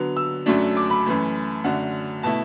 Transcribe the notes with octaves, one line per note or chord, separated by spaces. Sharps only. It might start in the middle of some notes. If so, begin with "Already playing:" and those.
Already playing: D3 F#3 B3
E6
F#2 F#3 A3 D4
D6
B5
F#2 E3 A3
F#2 D3 F#3 A3 D4 F#5
B2 A3 E4 A5